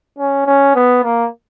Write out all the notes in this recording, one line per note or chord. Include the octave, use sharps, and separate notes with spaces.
C#4
C#4
B3
A#3